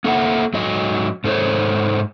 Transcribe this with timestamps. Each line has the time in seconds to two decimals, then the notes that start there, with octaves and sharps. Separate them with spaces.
0.04 A#3 A4 E5 F#5
0.54 G#2 F#3 D#5
1.24 G#2 A4 C5 C#5